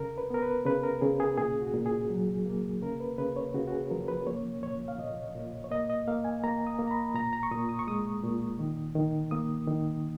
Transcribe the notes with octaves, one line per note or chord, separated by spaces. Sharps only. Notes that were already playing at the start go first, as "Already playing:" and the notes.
Already playing: C#3 A#4
B4
B3 A#4
B4
C#3 B4
A#4
C#3 G#4
G#4
A#2 G#4
F#4
A#2
G#4
F#3
A#3
C#3 A#4
B4
C#3 B4
C#5
C#3 F#4
F#4
G#4
F3 A#4
B4
A#3 C#5
A#2 C#5
F5
A#2 D#5
A#2
C#5
A#3 D#5
D#5
A#3 F5
G#5
A#3 A#5
D#6
A#3
A#5
B5
A#2 A#5
A#5
C#6
A#2 D#6
D#6
C#6
G#3 D#6
A#2
D#3
D#3
A#3 D#6
D#3